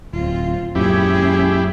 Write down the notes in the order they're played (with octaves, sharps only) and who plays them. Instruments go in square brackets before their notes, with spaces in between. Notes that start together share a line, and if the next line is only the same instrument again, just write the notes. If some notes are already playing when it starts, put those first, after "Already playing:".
[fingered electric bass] D1 [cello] C4 F4
[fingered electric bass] F#2 A#2 [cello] C#4 G#4 [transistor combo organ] E4 G4